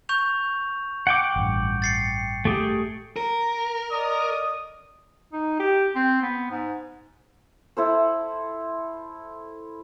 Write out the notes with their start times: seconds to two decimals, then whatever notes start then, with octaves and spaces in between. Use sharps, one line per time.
0.09 C#6 G6 F7
1.07 F#5 G5 D6
1.36 A1 G2
1.82 A6 C7 C#7
2.45 A3 G4 G#4
3.17 A#4
3.91 D5 D#5 D#6
5.32 D#4
5.59 G4
5.95 C4
6.22 B3
6.50 G#2
7.77 E4 A4 C5